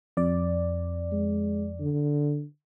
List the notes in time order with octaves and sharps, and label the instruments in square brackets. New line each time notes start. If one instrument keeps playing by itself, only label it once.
[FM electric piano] F2 D5
[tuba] G#3
D3